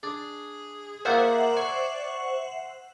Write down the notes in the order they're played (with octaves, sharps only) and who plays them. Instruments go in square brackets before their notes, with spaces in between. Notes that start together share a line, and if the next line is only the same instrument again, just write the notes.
[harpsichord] D4 [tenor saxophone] G#4
[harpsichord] A#3 F4 G#4 [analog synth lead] A#4 [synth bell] C5 E5 F#5 [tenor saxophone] D5
[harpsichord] G#5 [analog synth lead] C#6